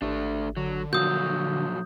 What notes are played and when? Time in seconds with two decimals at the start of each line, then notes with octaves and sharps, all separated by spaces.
0.02 G#1 A3 D4
0.57 D3 F#3
0.93 A#2 F3 F#3 F#4 D#6 E6 G6